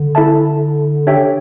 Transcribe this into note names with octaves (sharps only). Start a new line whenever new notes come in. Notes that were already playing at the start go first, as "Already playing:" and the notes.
Already playing: D3
E4 A4 E5 A5
D4 G4 C#5 E5 G5